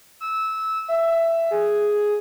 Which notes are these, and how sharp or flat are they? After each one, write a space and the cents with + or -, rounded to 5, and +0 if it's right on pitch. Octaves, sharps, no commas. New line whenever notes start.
E6 -15
E5 +10
G#4 +5